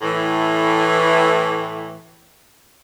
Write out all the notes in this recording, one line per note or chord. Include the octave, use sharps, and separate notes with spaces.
A2 E3